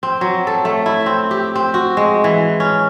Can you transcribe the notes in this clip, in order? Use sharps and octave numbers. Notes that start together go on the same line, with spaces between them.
C4
F#3
A4
A3
E4
C4
G4
C4
F#4
G#3
E3
C#4